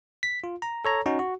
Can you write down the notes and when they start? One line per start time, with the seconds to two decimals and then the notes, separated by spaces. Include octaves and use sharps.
0.23 B6
0.44 F4
0.62 A#5
0.85 A4 C#5 A#5
1.06 C#4 D#4 F#4
1.19 F#4